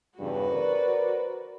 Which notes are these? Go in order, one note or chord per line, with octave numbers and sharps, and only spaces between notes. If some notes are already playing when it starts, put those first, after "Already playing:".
E2 G2 C#3 F#4 B4
A#4 C5 D5